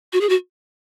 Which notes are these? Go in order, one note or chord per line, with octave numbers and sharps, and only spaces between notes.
F#4
G#4
F#4